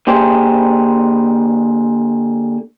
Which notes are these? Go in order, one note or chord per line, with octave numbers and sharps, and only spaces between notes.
D3 A#3 G4 G#4 C5